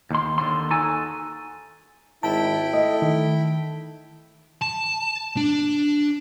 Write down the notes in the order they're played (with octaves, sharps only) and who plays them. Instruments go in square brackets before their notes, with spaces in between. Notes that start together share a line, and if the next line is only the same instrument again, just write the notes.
[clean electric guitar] D#2 C6
D#2 G#2 D3 C6
D#4 F#4 A4 G#5
[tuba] G#1 [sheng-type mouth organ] E4 G5 B5 [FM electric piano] A5
[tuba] A3 [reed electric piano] D#5
[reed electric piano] D#3
[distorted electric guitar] A5
D4